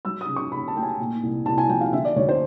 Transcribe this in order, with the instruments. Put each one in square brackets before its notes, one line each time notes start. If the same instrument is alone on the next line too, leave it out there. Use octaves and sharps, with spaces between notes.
[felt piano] F#3 E6
D#6
C#3
C#6
C#3 B5
A5
A3 G5
G#5
A#2
C2
C2 A5
G#5
F3 G5
F5
D3 E5
D5
D2 C#5
C5